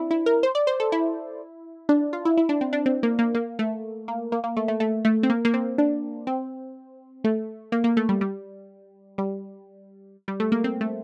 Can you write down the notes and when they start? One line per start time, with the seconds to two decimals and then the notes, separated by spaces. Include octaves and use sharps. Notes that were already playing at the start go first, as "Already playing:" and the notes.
Already playing: C4 D4 E4
0.11 E4
0.26 A#4
0.43 C5
0.55 D5
0.67 C5
0.80 A4
0.92 E4
1.89 D4
2.13 F4
2.25 E4
2.37 E4
2.49 D4
2.61 C4
2.73 D4
2.86 C4
3.03 A#3
3.19 A#3
3.35 A#3
3.59 A3
4.08 A#3
4.32 A#3
4.44 A#3
4.57 A3
4.68 A3
4.80 A3
5.05 A3
5.23 C4
5.30 A#3
5.45 A#3
5.54 C4
5.78 D4
6.27 C4
7.24 A3
7.72 A#3
7.84 A#3
7.97 A3
8.09 G3
8.21 G3
9.18 G3
10.28 G3
10.40 A3
10.52 A#3
10.64 C4
10.81 A3